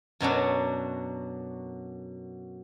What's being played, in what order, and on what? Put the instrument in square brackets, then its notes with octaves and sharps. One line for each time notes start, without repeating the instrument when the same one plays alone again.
[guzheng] F#2 B2 F#3 D4